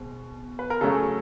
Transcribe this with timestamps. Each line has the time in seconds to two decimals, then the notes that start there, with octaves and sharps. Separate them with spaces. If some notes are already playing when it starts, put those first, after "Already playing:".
Already playing: B2 G#3 C4
0.59 B4
0.70 A#4
0.81 C#3 F#3 A3 C#4 A4